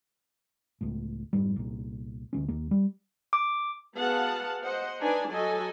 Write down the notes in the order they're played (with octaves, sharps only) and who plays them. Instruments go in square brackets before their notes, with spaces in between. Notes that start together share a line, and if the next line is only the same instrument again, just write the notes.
[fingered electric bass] C#2 A2
F1 G#2 G3
C2 A#2
D2 F#3 C#4
D#2 A#3
G3
[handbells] D6
[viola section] B3 F#4 G#4 F5 F#5 A5
C5 D#5 F#5
D4 D#4 B4 G#5 A5
F#3 F#4 A4 D#5 G#5